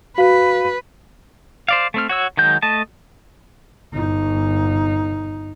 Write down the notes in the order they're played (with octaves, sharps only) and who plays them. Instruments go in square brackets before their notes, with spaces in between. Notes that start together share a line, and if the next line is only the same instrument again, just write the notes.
[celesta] F#4 F5 [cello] B4
[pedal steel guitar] C5 D5 F5
A3 C4 F6
F#4 C#5 E6
D#3 F#3 G#3 G6
A3 D#5 A5
[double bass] G1 D#4